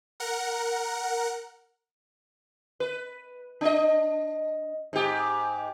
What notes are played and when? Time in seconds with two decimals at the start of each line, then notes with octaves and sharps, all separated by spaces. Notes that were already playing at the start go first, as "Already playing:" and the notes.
0.20 A#4 F#5
2.80 B4
3.61 D4 D#5
4.93 G#2 G4